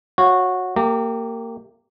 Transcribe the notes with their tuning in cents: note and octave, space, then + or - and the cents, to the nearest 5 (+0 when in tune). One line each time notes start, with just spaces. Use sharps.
F#4 -15 C#5 -15 F5 +10
A#3 -25 G4 +0 A#5 -45